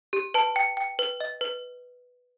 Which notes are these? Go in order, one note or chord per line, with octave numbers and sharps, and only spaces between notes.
G4
B4 A5
G5
G5
B4
D#5
B4